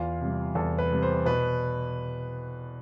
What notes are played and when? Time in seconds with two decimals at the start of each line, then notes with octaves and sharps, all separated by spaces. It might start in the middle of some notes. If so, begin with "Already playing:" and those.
Already playing: E2 F4
0.21 C3 G3
0.55 E2 A4
0.78 B4
0.91 C3 G3
1.03 C5
1.26 B2 B4